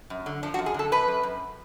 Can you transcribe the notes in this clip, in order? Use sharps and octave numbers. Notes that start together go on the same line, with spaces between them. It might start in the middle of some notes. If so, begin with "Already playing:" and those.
F#2
D3
F3 D4
F#4
F#2
G#4
D3 A4
F#2 B4
F#2
F#2